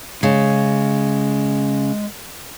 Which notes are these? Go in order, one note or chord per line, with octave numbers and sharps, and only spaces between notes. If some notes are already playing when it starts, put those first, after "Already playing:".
C#3 G#3